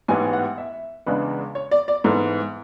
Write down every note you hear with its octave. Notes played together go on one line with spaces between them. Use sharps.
A1 G#2 E3 B3 G#5
F#5
E5
E2 C#3 G#3 B3 D4 B4
C#5
D5
D5
G#2 E3 B3 A4